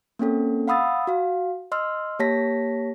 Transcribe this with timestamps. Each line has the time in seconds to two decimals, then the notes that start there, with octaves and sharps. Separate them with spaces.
0.19 A#3 C4 C#4 A4
0.67 F5 F#5 B5 D#6 E6 A6
1.07 F#4 F5
1.72 D#5 C6 E6 F6
2.19 A#3 G4 C#5 A5 A#6 B6